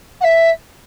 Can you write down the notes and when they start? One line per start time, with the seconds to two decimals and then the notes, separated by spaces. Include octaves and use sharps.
0.21 F#5
0.24 E5